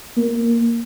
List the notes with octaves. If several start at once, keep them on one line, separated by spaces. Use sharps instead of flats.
A#3